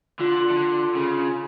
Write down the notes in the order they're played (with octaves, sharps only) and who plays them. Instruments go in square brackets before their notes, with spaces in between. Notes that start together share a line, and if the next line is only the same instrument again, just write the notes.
[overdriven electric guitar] D3 [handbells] F4
[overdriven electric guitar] D3
C#3